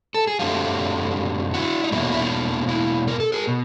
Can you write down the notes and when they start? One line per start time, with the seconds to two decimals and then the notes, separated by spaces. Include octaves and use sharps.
0.14 A4
0.27 G#4
0.39 F#2 D3 F#3 A3 C4 F4 G4
1.54 E4 F#4
1.84 D#4
1.92 E2 B2 F#3 A#3 E4
2.02 D#4
2.11 E4
2.21 D#4 F4
2.69 E4
3.08 A#4
3.20 A4
3.32 G#4 A#4
3.47 B2